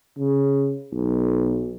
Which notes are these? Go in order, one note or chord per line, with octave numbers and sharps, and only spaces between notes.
C#3
B1